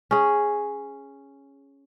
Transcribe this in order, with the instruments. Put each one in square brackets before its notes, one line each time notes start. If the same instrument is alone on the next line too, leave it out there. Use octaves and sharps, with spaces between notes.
[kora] C#4 G#4